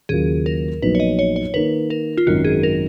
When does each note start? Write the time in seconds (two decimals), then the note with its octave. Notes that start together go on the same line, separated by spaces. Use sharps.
0.09 D#2 C#3 F#3 A#3 F4 G#4
0.46 A#4
0.82 A#1 A#2 F#3 B3 D#4 B4
0.95 C#5
1.00 D#5
1.19 C#5
1.36 C#5
1.54 D#3 A#3 D#4 B4
1.90 A#4
2.17 F4
2.27 G#1 F#2 D#3 F#3 F#4
2.44 G#4
2.63 A#4